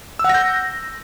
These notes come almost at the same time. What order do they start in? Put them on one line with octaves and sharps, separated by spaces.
E6 F#5 A#6 G6